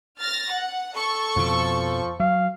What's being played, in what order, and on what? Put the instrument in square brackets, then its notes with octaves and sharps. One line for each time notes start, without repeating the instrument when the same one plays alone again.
[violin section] F6 A6 A#6
F#5
A4 C#6
[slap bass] F2 B2 [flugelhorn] F3
[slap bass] F#3 [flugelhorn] F5